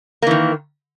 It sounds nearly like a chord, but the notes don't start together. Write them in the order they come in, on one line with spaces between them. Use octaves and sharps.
A#3 E3 D#3